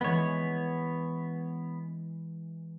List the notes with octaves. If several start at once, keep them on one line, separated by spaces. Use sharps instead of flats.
E3 G#3 B3 C#5